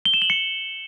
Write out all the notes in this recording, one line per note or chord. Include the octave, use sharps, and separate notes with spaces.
G7
E7
F#7
C#7